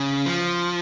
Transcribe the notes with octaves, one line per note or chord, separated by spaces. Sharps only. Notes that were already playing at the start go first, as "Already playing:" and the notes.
Already playing: C#3
F3